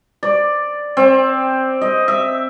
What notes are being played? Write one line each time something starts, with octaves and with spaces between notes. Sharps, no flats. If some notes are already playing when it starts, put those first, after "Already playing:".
D5
C4
D#5
E5